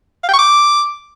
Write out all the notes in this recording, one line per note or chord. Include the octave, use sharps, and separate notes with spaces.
F5
G5
C#6
D6